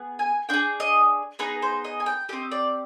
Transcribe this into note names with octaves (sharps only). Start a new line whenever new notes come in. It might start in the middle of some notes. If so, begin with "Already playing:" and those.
Already playing: B3 G#4
G#5
D4 G#4 G5
D#5
B3 D#4 G#4 B4
C5
D#5
G#5
G5
C4 G4 D#5
D5